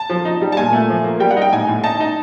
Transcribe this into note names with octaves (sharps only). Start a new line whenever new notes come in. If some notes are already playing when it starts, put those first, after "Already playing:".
Already playing: A5
F3
D#4
G3
A5
A#2 G#5
A3
F3
A#3
G3 G5
F#5
D#4
G5
A2 G#5
A2
D#4 A5
D#4